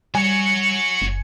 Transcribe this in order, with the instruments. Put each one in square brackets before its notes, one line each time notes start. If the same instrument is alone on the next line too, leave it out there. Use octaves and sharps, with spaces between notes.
[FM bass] G3 [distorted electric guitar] F#4 C#5 [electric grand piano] G#5 [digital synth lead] C#7
[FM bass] F#1